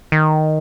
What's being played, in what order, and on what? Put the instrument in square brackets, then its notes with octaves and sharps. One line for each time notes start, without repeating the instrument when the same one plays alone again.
[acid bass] D#3